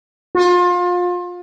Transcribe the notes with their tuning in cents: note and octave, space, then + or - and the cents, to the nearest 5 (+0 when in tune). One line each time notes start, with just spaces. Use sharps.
F4 +30